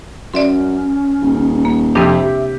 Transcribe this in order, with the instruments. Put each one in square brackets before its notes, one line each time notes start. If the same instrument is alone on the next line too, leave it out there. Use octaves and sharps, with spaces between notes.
[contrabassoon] F#2 [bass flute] C#4 [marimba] D5 E5 C6
[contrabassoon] D#1
[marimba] A#3
[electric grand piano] F2 G4 [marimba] C3 C4 D4 [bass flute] E5
[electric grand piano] G4